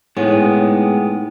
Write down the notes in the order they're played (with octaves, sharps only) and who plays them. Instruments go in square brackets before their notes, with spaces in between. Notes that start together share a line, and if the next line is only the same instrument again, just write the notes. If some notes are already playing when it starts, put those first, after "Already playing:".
[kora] A2 [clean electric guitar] G#3 B3 [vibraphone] D#4 G5 G#5